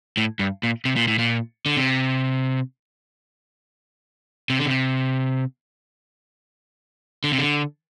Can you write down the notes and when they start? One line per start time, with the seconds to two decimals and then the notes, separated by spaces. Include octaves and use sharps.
0.17 A2
0.39 G2
0.63 A#2
0.85 C3
0.96 A#2
1.08 A2
1.19 A#2
1.66 D3
1.77 C3
4.50 C3
4.59 D3
4.66 C3
7.24 D3
7.32 C3
7.38 D3